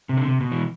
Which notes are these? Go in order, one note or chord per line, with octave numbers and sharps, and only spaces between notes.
C3
D3
C3
B2
E3